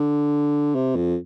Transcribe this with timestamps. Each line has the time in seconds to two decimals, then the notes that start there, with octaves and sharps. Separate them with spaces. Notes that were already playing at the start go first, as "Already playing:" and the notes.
Already playing: D3
0.75 C3
0.96 F2